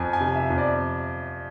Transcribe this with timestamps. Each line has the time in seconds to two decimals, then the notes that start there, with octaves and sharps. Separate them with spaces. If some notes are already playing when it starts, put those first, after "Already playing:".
Already playing: F2 G#5
0.13 G#5
0.20 C3
0.35 E5
0.50 F2
0.58 D5